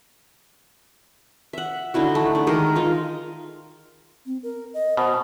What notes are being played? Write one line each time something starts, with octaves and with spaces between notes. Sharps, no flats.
E5 F#5
D3 D#4 E4 F#4
A3
D4
D#3 G#3 A#4
D#4 F4
C4
A#4
D#5
B2 C5